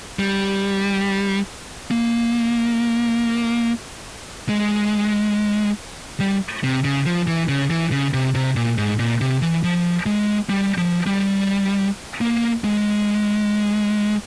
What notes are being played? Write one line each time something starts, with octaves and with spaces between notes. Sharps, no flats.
G3
A#3
G#3
G3
C3
C#3
F3
E3
C#3
E3
C#3
C3
C3
A#2
G#2
A#2
C3
E3
F3
G#3
G3
F3
G3
A#3
G#3